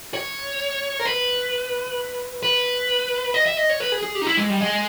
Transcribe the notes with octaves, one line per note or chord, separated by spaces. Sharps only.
C#5
A#4
B4
B4
D#5
E5
D#5
C#5
B4
G#4
G#4
G4
D#4
E4
G#3
G3
G#3